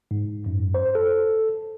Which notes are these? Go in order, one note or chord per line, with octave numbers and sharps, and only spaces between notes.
G#2
F#2
C5
A4